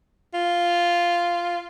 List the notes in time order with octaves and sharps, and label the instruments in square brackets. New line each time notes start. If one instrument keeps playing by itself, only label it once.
[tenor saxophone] F4